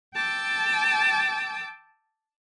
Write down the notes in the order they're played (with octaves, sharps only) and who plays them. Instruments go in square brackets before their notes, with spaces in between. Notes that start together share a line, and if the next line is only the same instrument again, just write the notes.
[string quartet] G5 A5 D6 E6